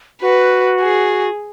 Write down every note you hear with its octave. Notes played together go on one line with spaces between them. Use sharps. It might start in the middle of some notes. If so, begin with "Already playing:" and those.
F#4 B4
G#4